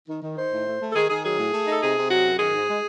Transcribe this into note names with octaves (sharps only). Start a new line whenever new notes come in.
D#3
D#3
D#4 C5
A2
A3
A3
A4
D#3 G#4
D#3 G#4
F#3 G#4
A2
A3
D#4 A4
C3 G#4
C3
F#3 F#4
F#2
D#3 G#4
G#2
G#3